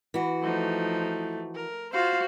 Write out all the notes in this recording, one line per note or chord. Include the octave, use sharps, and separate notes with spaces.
E3 F#4
F3 A3 D#4
A#4
F4 F#4 C5 F5